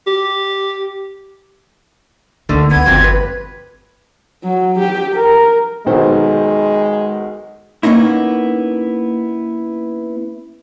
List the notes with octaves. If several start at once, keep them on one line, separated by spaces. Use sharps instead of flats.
G4
D2 D3 D#3 A3
D2 B3 G#6
G1 F2 C4 C#4 G4
B4
F#3
G4
A#4
B1 D#3 G#3 C5
A#3 B3 C#4 D#4 E4